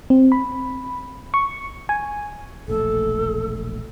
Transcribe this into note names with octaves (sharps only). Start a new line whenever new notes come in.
C4
B5
C#6
G#5
E1 A#1 A3 A4